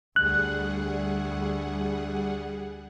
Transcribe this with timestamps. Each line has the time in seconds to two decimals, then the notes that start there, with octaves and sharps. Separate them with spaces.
0.16 D2 G3 G#4 F#5 F#6